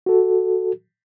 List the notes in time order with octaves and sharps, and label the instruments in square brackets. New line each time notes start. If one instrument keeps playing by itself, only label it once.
[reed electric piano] F#4 A4